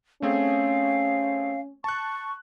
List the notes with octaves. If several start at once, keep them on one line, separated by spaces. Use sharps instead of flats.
A3 C4 C#4 G#4 F5
A5 C#6 F#6